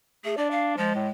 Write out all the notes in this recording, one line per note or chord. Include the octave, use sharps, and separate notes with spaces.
A3 G#4
D4 D5
F5
F3 G#3
A2